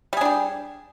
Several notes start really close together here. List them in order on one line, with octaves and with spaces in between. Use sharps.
G3 G#4 D4 G4